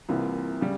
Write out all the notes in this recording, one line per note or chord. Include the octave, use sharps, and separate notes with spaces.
C2 C3 E3 A#3 F4
C#3 G3